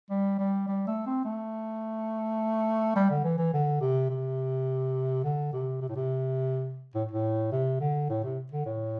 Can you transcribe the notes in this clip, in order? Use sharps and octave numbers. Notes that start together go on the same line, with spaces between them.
G3
G3
G3
A3
C4
A3
G3
D3
E3
E3
D3
C3
C3
D3
C3
C3
A2
C3
A2
A2
C3
D3
A2
C3
D3
A2